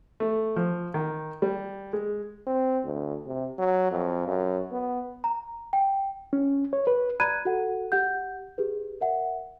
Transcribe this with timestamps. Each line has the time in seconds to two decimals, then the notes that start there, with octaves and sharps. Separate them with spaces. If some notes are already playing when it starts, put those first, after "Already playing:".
0.20 A3
0.56 F3
0.94 D#3
1.42 G3
1.93 G#3
2.47 C4
2.84 D2
3.27 C3
3.59 F#3
3.91 F2
4.27 F#2
4.72 B3
5.24 A#5
5.73 G5
6.33 C#4
6.73 C#5
6.87 B4
7.20 D5 A#5 B5 F#6 G#6 D#7
7.45 F#4 A4 F#5
7.92 G4 F#5 G6
8.58 G4 G#4 B4
9.01 A#4 E5 F#5